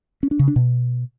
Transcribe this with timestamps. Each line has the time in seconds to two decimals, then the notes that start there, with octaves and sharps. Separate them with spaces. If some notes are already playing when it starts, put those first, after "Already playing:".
0.23 C#4
0.31 D4
0.39 C#3
0.48 D4
0.56 B2